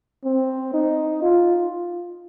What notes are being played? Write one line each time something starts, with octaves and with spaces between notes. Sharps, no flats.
C4
D#4
F4